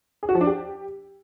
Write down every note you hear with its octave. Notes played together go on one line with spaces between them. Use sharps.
G#4
F#4
F3
D4
G4